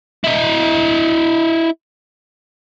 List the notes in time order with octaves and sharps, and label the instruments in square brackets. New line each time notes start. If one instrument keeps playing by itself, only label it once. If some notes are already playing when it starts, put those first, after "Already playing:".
[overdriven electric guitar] E4 D#5